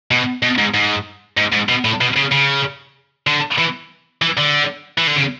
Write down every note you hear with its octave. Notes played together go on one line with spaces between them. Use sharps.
B2
B2
G#2
G#2
G#2
G#2
B2
A2
B2
C#3
C#3
D3
E3
E3
D3
E3
D3
C#3